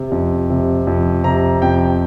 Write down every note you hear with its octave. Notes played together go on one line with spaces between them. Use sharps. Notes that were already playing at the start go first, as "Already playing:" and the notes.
Already playing: C3
F2
C3
F2
C3 A#5
F2 G5